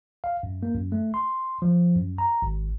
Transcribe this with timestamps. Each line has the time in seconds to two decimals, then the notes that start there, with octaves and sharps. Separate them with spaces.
0.24 F5
0.43 F#2
0.63 A#3
0.75 F#2
0.92 A3
1.14 C6
1.62 F3
1.95 F#2
2.18 A#5
2.42 G#1